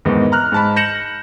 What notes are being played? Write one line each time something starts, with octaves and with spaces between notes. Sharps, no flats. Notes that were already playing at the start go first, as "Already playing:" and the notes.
E2 G#2 D#3
A#5 F6 F#6
G#2 A5 B5
G6 A#6 C#7 E7 F#7